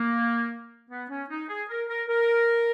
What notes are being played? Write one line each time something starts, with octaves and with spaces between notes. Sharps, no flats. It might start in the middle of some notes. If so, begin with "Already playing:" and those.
Already playing: A#3
B3
C#4
D#4
G#4
A#4
A#4
A#4